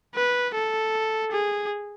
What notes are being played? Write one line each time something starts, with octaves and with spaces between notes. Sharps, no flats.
B4
A4
G#4